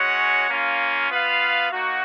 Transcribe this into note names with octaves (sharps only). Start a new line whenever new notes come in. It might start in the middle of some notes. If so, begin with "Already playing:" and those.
Already playing: G#3 C#4 F#4 C#5 F#5
A#3 C#4 F4
B3 F4 B4 F5
A#3 D#4 F#4